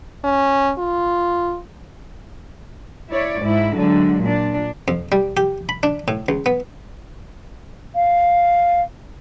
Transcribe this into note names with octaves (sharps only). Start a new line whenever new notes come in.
C#4
F4
E4 C#5 D5
G#2 E4
D3 F#3 G#3
A#2 D4
F2
G3
G4
B5
D4
A2
C#2
B3
F5